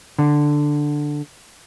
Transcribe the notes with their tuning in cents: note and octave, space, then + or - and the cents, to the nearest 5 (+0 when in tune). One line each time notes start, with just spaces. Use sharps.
D3 +5